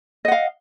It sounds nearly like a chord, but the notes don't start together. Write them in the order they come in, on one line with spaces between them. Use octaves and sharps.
D#5 F#5 F5